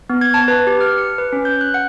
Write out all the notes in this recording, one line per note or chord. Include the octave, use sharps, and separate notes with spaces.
B3
G#6
A5
B4
G4
F6
C#7
B4
C#4
G6
F#6
F#5